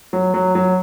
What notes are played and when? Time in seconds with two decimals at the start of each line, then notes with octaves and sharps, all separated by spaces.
0.13 F#3
0.34 F#3
0.55 F#3